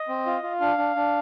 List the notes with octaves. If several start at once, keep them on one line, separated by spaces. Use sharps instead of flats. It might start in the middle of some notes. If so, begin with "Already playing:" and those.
Already playing: D#5
C4
F4
F4
D4 F5
D4
D4